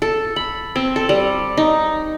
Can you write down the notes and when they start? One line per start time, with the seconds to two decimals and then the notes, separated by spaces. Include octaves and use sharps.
0.02 A4
0.36 B5
0.76 C4
0.96 A4
1.09 G3
1.57 D#4